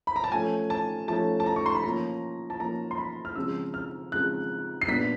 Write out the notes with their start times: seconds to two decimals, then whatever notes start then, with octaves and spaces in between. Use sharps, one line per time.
0.07 B5
0.16 A#5
0.24 A5
0.32 F3 A3 C#4 G#5
0.70 A5
1.08 F3 A3 C#4 A5
1.40 A5
1.46 A#5
1.56 C#6
1.66 C6
1.75 B5
1.84 F3 A#3 C#4 A#5
2.50 A5
2.60 F3 A#3 C#4 A#5
2.91 C6
2.98 B5
3.25 F6
3.36 C#3 F3 G#3 C4 E6
3.74 F6
4.12 C#3 F3 G#3 C4 F#6
4.82 C7
4.88 A#2 G3 B3 D4 B6